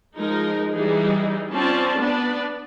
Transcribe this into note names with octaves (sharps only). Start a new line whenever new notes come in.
F3 G#3 D#4 A#4
E3 G3 D#4 G#4
C4 C#4 F4 D5 A5
B3 D4 B4 D5